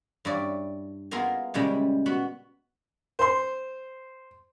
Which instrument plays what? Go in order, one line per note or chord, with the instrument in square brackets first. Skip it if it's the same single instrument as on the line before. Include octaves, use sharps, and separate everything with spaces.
[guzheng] G2 E4 C#5 D5
A#3 B3 E4 F4 G#4 A#4
A#2 C#3 G3 G#3 E4
B3 F#4 F#5 B5
[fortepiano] C5 C6